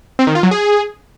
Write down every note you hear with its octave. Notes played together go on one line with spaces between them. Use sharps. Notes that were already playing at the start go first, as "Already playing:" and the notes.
C4
D#3
F4
F#3
G#4